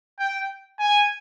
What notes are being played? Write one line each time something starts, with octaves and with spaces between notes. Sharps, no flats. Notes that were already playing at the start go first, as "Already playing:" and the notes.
G5
G#5